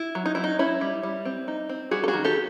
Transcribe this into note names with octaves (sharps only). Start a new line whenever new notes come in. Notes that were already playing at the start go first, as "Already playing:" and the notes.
Already playing: E4
F#3
D#4
F#3 E4
D#4
C#4 E4
G3
G3
C4
D#4
C4
G3 F#4 G#4
A4
F#4 G#4
D#3
G4 A4